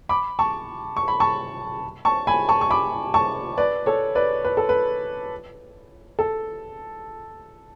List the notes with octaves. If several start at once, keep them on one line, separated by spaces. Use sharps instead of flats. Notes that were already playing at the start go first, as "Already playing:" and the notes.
B5 D6
A5 C#6
C#6
B5
A5 C#6
A5 C#6
G#5 B5
A5 C#6
C#6
B5 D6
A5 C#6
B4 D5
A4 C#5
B4 D5
B4
A4
B4
A4